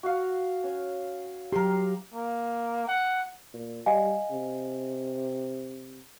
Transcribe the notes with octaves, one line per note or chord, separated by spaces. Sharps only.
F#4 F5
C#4
F#3 G4 A#4 C6
A#3
F#5
A#2
G3 D#5 F5 G#5
C3